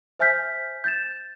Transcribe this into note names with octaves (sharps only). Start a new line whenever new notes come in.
C5 E5 G#5 F6 G6 B6
G6 A6 E7